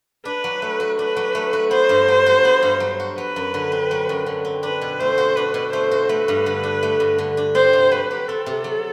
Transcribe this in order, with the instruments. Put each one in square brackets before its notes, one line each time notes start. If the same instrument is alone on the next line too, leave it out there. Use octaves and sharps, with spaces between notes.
[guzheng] D4 [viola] B4
[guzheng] F#3
A3
F#4
[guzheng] D4 [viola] B4
[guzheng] F#3
A3
F#4
[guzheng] B3 [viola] C5
[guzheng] G2
F#3
F#4
B3
G2
F#3
F#4
[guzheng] F#3 [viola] B4
[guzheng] F#2
D3
C4
F#3
F#2
D3
C4
[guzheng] D4 [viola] B4
[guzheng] B2
[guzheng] A3 [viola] C5
[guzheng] F#4
[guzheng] D4 [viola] B4
[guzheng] B2
[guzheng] A3 [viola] C5
[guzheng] F#4
[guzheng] A3 [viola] B4
[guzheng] G2
D3
D4
A3
G2
D3
D4
[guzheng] C4 [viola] C5
[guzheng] C3
[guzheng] F#3 [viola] B4
[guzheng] G4
[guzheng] C4 [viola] A4
[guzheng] C3
F#3